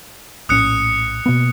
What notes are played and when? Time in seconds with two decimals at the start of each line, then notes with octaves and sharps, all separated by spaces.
0.49 A#1 A2 C#4 D#6 F#6 C#7
1.26 B2 A#3 B3